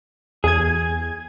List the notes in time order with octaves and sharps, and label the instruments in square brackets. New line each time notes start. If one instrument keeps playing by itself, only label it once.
[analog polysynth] E2 G#6 [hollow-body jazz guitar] G#4